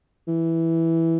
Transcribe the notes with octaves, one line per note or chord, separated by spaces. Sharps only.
E3